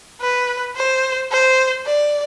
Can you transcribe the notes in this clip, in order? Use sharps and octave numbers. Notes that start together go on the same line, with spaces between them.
B4
C5
C5
D5